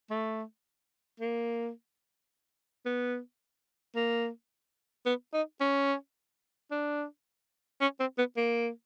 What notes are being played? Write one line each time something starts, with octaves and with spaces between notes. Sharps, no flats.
A3
A#3
B3
A#3
B3
D#4
C#4
D4
C#4
C4
B3
A#3